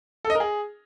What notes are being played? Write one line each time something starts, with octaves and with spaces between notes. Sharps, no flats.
A4
D#5
A#4
G#4